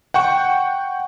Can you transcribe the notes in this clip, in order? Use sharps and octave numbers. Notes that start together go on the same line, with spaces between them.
F#5 G5 C#6